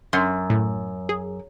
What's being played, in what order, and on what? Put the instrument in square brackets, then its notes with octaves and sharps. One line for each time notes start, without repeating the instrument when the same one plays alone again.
[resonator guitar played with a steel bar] F#2 [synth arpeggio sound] F#5 C6
[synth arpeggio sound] A2
G#4